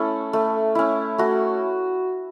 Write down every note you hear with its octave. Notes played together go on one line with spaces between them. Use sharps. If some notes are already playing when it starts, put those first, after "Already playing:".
Already playing: A3 C#4 E4 A4
A3
C#4 E4
A3 F#4